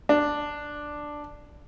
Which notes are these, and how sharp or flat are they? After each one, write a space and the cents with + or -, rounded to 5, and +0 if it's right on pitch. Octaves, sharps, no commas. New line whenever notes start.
D4 +5